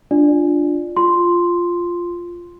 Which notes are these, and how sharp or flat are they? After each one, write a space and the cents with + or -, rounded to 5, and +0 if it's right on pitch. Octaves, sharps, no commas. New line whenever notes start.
D4 +0 F4 +0 D5 +15
F4 +0 C6 +0